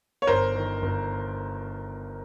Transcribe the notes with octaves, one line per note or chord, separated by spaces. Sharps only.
C#5
G1 A#4 C5
D#3
G1